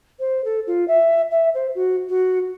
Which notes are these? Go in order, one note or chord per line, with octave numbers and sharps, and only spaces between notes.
C5
A4
F4
E5
E5
C5
F#4
F#4